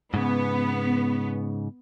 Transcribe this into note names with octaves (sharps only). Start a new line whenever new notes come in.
G#2 C#3 B3